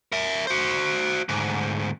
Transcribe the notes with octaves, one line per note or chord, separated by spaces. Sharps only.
A#4 E5
F#4 C5
D2 G#2